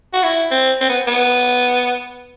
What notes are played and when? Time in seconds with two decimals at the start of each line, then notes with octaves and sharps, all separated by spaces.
0.14 F#4
0.23 E4
0.51 C4
0.81 C4
0.89 B3
1.07 B3